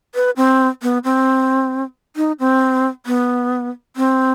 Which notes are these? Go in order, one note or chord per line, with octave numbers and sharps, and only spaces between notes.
B4
C4
B3
C4
D#4
C4
B3
C4